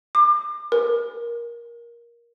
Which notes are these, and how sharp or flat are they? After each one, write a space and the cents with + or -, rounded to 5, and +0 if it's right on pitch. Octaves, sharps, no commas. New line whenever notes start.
D6 +30
A#4 +15